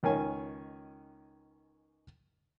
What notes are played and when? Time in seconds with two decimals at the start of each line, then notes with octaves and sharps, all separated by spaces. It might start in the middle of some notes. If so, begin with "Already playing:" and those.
0.03 C#2 D#3 C#4 G#5